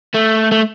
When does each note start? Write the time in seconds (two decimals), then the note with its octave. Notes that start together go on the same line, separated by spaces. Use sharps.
0.14 A3
0.52 A3